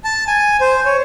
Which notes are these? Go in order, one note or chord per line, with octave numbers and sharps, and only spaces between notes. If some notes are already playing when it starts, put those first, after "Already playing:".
A5
G#5
C5
C#5